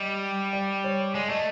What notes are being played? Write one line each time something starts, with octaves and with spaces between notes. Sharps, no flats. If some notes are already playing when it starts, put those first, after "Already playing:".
Already playing: G3 D#5
D5
C#5
G#3 D5
A3 D#5